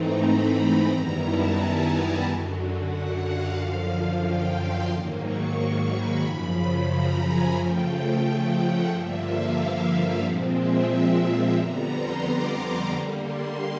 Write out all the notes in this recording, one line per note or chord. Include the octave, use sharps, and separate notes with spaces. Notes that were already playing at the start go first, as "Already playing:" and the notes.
Already playing: G#2 E3 A3 C4 D#4 A#5
B5
A#5
F#2 D#3 G3 B3 E4 A#5
A5
G#5
F#2 D3 F#3
F#5
F5
F#2 D3 F3 F5
F5
G5
C6
G#2 D#3 F#3 A#3
C#6
C#6
B5
F#2 C#3 F3 B5
A#5
G#5
C#3 F3 A3 G5
F#5
G2 D3 F3 A#3 E5
F5
A#2 F3 G#3 C4 F#5
E5
F2 D3 G3 B3 A#5
C6
D6
D3 G3 A#3 C#6
C6